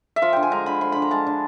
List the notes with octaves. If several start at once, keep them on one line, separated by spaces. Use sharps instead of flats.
E5
F3 F5
D3 G5
G#5
G#3 A#5
D3 B5
F3 C6
D3 B5
A#5
G#3 A5
D3